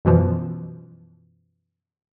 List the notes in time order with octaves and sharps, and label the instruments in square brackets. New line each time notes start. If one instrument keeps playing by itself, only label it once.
[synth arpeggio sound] F#2 B2 E3 F3